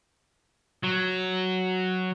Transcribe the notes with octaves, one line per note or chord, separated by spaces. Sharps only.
F#3